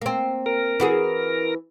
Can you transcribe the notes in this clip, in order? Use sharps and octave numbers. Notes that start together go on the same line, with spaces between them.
A#3 C4
A#4
E3 F#4 G#4